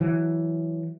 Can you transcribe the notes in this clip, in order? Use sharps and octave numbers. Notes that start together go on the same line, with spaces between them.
E3 F#3